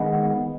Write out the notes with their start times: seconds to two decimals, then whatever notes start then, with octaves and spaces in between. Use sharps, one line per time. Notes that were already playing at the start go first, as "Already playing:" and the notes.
Already playing: D#3 G#3 B3